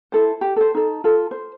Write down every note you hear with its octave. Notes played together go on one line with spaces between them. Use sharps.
E4 A4 C5
G4
A4 C5
D#4 A4
F4 A4
C5